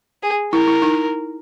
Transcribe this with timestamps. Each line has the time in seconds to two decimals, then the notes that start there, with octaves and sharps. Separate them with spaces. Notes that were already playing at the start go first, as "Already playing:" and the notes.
0.23 G#4
0.52 E4 A#4
0.67 E4
0.82 D#4